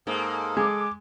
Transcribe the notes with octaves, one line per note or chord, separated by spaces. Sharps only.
G#2 A#3 G#4 A4
G#3 D6